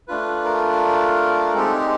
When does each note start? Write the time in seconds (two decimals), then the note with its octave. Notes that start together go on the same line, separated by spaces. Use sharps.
0.08 A3 D4 F4 B4
0.44 A#4
1.54 G#3 C4 D#4 G4 A4
1.73 G#4